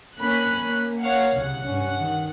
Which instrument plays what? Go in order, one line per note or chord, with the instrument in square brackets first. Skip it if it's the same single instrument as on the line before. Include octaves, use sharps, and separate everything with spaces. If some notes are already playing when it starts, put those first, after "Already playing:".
[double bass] A#3 [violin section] C#4 B5 F#6
[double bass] A#3
[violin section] C#5 F5 F#5
[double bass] C2 C#3 [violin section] F#5
[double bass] G2 C#4
D#3